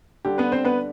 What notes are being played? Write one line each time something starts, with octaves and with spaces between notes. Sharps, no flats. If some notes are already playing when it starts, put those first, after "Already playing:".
D3 G3 D4 G4
B3 B4
C4 C5
B3 B4